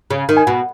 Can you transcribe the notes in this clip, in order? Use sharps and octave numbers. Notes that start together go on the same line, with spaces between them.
C#3
D#3
G#5
B2 F#5